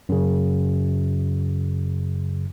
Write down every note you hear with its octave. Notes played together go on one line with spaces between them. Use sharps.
F#2 C#3